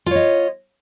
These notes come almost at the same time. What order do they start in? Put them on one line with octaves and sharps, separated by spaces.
F4 C#5 D#5